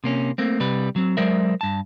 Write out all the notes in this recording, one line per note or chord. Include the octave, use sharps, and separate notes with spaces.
C3 A#3 C#4
A3 A#3 C4
C3 G3 B4
F#3 C4
F#3 G#3 A#4 C5 D5 E5
G2 A5